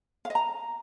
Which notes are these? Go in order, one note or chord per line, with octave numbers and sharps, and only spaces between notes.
F5
D#5
A#5